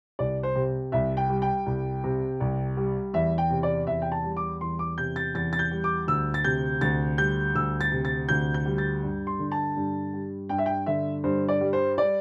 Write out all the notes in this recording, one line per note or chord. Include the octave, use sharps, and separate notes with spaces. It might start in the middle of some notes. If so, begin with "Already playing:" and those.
C2 D5
C5
C3
C2 E5
G5
G3
G5
C2
C3
C2
G3
E2 E5
G5
C3
D5
E2 E5
G5
A5
G3
D6
E2 C6
D6
C3 G6
A6
E2 A6
A6
G6
G3
D6
D2 E6
A6
C3 G6
D2 A6
G3 G6
D2 E6
A6
C3
A6
D2 G6
G6
G3
A6
G2
C6
D3
A5
G2
G3
G2 G5
E5
G5
D3 E5
G2 C5
D5
G3
C5
D5